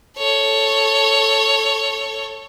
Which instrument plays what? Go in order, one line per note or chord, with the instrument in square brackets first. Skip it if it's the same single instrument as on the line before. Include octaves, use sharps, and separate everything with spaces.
[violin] A4 C#5